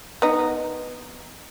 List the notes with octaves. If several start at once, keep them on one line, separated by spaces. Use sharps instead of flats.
B3 D#4